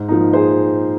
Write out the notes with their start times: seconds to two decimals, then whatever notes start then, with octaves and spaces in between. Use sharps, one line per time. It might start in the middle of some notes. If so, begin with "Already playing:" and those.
Already playing: G#2
0.08 F3 A#3 D#4
0.33 G#4 C5